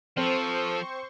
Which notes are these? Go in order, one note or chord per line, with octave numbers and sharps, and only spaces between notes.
F3 C4 A4 C5 C6 C#6